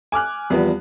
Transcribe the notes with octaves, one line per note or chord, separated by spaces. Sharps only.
G#5 D6 F6 F#6
E2 F3 G3 B3